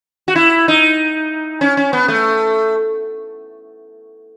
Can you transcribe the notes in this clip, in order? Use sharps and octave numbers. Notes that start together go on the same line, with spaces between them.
F#4
E4
D#4
C#4
C#4
B3
A3